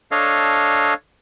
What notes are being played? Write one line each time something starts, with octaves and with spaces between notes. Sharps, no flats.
D4 A4 C#5 D#5 F5